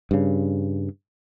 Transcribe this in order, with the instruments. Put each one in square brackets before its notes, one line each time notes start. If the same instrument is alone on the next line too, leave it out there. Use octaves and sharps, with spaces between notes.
[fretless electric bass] G2 C#3